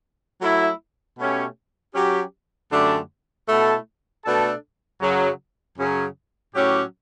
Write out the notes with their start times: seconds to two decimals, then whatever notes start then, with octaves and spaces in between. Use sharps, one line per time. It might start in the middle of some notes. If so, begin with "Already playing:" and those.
0.42 F#3 A3 E4
1.18 B2 A3 C#4 G4
1.94 F#3 C#4 G4
2.71 F#2 D3 A3 D4 G4
3.48 B2 A3 E4 A4
4.24 B2 A3 D4 A4
5.01 F#2 C#3 F#3
5.78 F#2 C#3 F#3 C#4
6.54 A2 F#3 C#4 G4